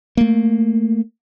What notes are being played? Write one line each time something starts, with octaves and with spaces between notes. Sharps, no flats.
A3 A#3